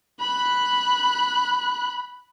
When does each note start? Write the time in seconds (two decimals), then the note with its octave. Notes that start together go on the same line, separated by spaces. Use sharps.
0.20 B5 F#6